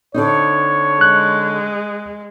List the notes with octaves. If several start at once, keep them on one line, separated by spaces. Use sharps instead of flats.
D3 C4 D#4 C#5
G#3 F#6